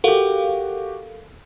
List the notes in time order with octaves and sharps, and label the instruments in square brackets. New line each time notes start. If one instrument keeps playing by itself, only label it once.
[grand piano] F#4 G4 [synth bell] A4 A#4 F5